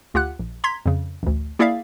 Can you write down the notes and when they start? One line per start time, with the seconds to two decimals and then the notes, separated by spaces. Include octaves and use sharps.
0.14 D2 F4 G4 F#5 F#6
0.39 A#1
0.64 A#5 C6 G#6 B6
0.86 F2 C#3
1.23 A1 D2
1.59 A#3 E4 G#4 D5 E5 F5